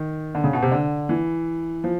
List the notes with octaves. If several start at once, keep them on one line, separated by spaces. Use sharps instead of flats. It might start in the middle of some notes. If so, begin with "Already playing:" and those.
Already playing: D#3
D3
C#3
B2
C3
D3
E3
F3